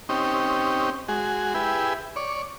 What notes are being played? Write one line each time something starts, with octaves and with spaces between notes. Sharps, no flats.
C4 C#4 D#4 G4
G#3 F#4 G#4
E4 G4 G#4 B4
C#5 D5